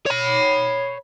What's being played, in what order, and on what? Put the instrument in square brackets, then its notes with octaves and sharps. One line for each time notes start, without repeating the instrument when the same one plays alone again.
[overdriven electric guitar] C#5 B5